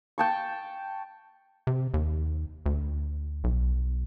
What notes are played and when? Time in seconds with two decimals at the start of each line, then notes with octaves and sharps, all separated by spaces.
0.18 G5 A5 C#6
1.67 C3
1.94 D#2
2.66 D2
3.44 B1